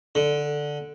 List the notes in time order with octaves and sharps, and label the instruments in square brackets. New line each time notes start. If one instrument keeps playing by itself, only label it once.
[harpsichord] D3